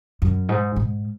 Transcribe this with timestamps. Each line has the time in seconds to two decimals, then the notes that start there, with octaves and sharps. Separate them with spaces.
0.22 F#2
0.49 G#2
0.76 G#2